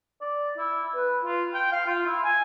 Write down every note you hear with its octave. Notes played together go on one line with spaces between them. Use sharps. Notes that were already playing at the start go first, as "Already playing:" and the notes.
D5
E4
B4
F4
G5
F5
F4
E4
G#5